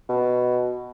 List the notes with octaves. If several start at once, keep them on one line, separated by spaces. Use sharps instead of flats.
B2